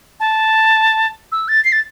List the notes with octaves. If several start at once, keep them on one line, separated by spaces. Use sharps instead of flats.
A5
E6
A6
C7
A6